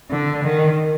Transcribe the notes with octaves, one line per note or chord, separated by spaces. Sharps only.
D3
D#3